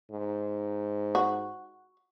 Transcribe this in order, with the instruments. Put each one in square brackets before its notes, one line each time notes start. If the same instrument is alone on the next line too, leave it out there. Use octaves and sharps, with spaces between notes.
[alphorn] G#2
[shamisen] F#4